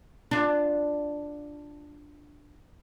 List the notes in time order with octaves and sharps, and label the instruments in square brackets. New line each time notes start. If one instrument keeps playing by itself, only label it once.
[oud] D4 F4